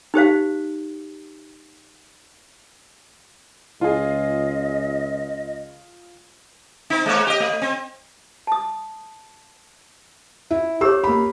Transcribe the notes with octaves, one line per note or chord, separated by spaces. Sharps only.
D#4 G4 C5 F5
C#2 F4 G#4 D#5
C4 D#4
G#3 A#3 C#5
G4 D#5
A3
C4
A5 D#6
E4
G4 G#4 C#5 E6
A#3 B5